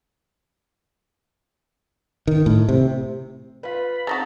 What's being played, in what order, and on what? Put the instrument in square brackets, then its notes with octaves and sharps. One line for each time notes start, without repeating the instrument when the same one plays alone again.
[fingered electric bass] D#3
A2
C3
[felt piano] F4 B4 [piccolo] B5
[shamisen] G#3 D#4 F#4 [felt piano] C4 [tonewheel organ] A5 A#5